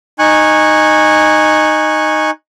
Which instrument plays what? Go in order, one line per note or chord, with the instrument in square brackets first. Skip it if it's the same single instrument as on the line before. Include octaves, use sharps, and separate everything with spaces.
[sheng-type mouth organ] D#4 G#5 C#6 F#6